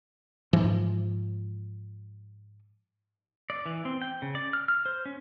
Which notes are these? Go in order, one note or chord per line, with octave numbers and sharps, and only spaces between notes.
G#2 E3 F3
D5
E3
C4
G5
C#3
D5
F6
F6
C5
C#4